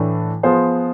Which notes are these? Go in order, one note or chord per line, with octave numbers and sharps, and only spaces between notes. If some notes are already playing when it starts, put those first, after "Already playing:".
Already playing: A2 E3 A3 D4
F3 B3 F4 G#4 C5